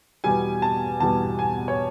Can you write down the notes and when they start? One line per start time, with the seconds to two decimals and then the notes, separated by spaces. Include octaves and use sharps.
0.24 E2 B2 G3 G#5
0.62 A5
1.00 E2 B2 G3 A5
1.39 G#5
1.68 C#5